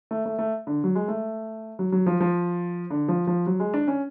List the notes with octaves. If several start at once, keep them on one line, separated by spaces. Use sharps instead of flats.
A3
A3
A3
D3
F#3
G#3
A3
F#3
F#3
F3
F3
D3
F3
F3
F#3
G#3
D4
C#4